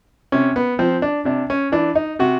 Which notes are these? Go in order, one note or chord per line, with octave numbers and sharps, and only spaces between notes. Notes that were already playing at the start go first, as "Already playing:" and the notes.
C3 C#4
B3
F3 C4
D4
C3 D4
C#4
E3 D4
D#4
C3 F#4